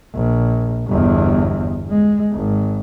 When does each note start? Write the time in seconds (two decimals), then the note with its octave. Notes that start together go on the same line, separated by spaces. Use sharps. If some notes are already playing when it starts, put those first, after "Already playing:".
0.15 A#1
0.87 G1 E2
1.90 G#3
2.33 G#1